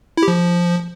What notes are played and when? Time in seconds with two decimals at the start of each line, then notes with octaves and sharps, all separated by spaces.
0.17 E4
0.23 G4
0.28 F3